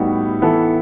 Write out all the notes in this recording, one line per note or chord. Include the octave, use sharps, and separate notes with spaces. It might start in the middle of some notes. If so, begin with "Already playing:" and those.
Already playing: A2 G3 B3 D#4 F#4
E3 B3 E4 A4